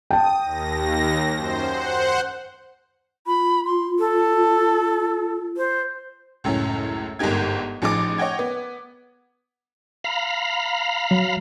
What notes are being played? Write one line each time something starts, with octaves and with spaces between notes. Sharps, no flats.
G5 A5 D#6
D#2 A#6
F#2 C5
C5 F#5
F4 B5
C6
A4
C5
C#2 F#2 A2 C#4
G1 G#2 A#3 D#4 G4 G#6
A1 F3 D#4 G#4 D6
C#5 D#5 F#5 G5 G#6
B3
F5 A#5 B5
F#3